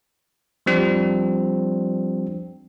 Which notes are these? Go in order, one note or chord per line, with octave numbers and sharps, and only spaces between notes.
F3 G3 C4 D4